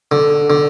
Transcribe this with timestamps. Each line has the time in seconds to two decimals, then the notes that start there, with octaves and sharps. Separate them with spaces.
0.11 D3
0.50 D3